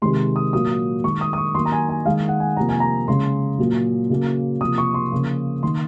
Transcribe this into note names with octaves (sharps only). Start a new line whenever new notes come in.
C3 D#3 G#3 C6
D#6
A#2 F#3 A#3 D#6
D#3 G#3 C#6
D#6
D#6
C#6
D#3 F#3 A#3 C6
A#5
G#5
G#5
D#3 G#3 F5
F#5
G#5
C3 F3 A#3 A#5
G#5
A#5
C#3 G#3 C6
A#2 F#3 A#3
C#3 F#3 A#3
C3 F3 A#3 D#6
C#6
C6
C#3 F3 A#3
D#3 A#3 C6